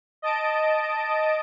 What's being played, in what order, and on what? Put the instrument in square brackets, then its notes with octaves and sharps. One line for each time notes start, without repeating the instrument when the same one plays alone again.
[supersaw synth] D#5 A5 D7